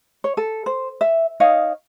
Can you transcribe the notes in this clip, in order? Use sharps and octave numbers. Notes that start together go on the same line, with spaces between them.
C#5
A4
C5
E5
D#4 C#5 D#5 F5